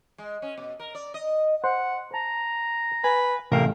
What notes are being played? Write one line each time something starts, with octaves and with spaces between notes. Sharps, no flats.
G#3
C#4
B2
A#4
D5
D#5
C5 F#5
A5 A#5
B4 G#5
A1 C3 A3 A#4 F5 G5